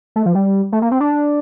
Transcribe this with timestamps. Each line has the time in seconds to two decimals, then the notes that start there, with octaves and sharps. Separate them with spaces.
0.16 A3
0.26 F3
0.35 G3
0.72 A3
0.82 A#3
0.91 C4
1.00 D4